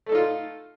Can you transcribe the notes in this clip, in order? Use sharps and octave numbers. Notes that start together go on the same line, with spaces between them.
A3 D#4 F4 A4